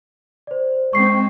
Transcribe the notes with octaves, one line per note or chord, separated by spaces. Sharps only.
C5 D5
G#3 C4 C#6 C7